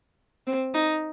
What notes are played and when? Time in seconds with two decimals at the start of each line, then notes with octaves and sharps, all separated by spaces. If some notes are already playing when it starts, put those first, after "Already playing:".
0.47 C4
0.74 D#4